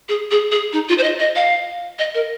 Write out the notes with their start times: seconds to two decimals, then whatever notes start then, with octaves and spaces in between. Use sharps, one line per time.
0.09 G#4
0.31 G#4
0.52 G#4
0.73 D#4
0.89 F4
0.98 C5
1.03 D#5
1.20 D#5
1.36 F5
1.99 D#5
2.14 A#4